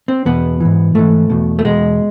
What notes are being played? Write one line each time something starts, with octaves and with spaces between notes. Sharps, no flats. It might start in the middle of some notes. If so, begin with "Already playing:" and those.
C4
E2 B2 B3
G#2 E3
G#2 E3 A3
E2 B2
A3
E2 B2 G#3